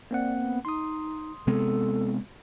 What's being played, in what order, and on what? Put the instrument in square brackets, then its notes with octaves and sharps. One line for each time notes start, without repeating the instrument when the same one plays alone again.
[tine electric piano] A#3 C4 F#5 [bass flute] D5
[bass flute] B3
[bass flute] D#4 [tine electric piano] C6 D#6
[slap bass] C3 G#3 B3 [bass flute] A4